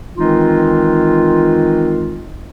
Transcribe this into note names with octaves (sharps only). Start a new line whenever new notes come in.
D#3 E3 G#3 C4 D#4 F4